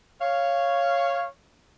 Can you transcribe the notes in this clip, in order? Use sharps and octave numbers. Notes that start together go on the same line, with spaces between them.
C#5 F5